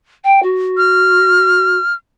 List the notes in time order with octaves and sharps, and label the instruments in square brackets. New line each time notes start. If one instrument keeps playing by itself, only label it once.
[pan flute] G5
F#4
[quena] F6